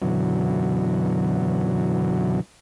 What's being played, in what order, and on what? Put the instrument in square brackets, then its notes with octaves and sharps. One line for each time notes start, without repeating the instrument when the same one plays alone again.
[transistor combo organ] F#2 B2 D3 E3 F#3